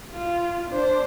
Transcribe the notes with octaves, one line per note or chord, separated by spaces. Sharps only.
F4
D4 C5